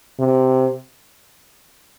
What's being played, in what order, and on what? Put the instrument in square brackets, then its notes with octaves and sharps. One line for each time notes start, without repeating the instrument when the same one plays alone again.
[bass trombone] C3